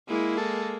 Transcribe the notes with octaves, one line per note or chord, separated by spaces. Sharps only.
G#3 A#3 E4
A4